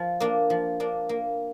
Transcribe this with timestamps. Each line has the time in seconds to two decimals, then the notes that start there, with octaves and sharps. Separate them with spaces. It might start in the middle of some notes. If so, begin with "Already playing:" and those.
Already playing: F3
0.20 A#3 D4
0.50 F3
0.80 A#3 D4
1.09 A#3